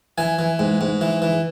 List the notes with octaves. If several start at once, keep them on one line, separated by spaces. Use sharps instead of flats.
E3 G#5
E3
G#2
G#2
E3
E3